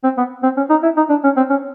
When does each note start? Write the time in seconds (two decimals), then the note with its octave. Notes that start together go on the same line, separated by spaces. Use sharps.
0.04 C4
0.17 B3
0.43 C4
0.57 C#4
0.70 D#4
0.83 E4
0.97 D#4
1.09 D4
1.24 C#4
1.37 C4
1.50 C#4